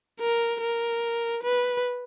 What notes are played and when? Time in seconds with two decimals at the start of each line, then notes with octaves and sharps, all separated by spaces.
0.20 A#4
0.61 A#4
1.43 B4